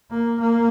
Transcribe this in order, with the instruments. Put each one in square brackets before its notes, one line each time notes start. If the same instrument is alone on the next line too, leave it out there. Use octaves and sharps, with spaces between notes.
[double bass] A#3
A#3